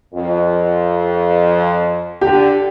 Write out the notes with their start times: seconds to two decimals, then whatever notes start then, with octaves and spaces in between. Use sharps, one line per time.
0.14 F2
2.21 D3 G4